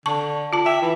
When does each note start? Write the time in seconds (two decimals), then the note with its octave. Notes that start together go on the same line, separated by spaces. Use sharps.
0.06 D3 A5 C#6
0.53 F4 A5
0.66 E5 G5
0.82 E3